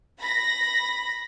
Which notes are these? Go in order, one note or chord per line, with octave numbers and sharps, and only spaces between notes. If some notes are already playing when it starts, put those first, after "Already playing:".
B5 A#6